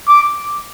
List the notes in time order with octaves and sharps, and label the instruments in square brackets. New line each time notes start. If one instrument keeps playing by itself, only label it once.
[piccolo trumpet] D6